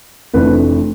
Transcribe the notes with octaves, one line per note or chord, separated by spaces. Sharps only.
F1 F2 E3 A3 D4 B4